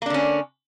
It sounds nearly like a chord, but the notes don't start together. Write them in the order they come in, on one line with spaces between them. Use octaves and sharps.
A#3 D4 D3 C#4